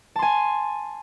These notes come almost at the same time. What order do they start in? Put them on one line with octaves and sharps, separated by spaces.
A5 C6 G#5